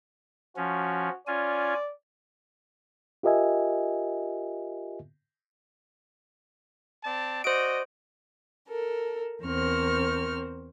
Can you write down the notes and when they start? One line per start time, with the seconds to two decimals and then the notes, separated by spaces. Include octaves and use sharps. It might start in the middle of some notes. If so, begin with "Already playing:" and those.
0.57 F3 C#4 F#4
1.27 C#4 F4 D5 G#5
3.23 F4 G4 A#4 D#5 E5 G#5
7.04 C4 D5 A5
7.44 F#4 C5 D5 D#5 D7
8.69 A4 A#4
9.44 E2 C4 A#4 C5 C#6 F6